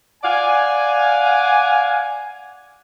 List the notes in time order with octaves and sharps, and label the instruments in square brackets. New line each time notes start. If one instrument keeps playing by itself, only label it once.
[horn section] D5 F5 F#5 G#5